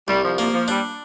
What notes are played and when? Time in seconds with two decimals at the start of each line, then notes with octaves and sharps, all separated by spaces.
0.08 C2 G3
0.23 F3
0.38 F3 A#3
0.53 F3
0.68 G3 D4